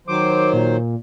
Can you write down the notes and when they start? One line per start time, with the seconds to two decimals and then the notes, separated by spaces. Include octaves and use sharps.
0.08 D#3 F#3 C5 D6
0.53 A#2